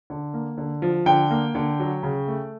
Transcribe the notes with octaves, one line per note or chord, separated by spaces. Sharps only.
D3
A#3
D3
F3
D3 G5
A#3
D3
F#3
C#3
A3